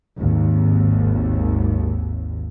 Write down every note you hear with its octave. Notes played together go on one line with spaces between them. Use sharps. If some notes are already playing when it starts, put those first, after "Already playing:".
G#1 D#2